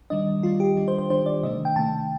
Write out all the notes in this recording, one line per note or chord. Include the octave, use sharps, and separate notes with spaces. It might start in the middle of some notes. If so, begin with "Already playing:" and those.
D#3 G3 D4 D#5
D#3 G3 D4 F4
G4
D#3 G3 D4
C5
C5
D#3 G3 D4 C5
D5
C3 D#3 A3 D4 D#5
G5
C3 D#3 A3 D4 A5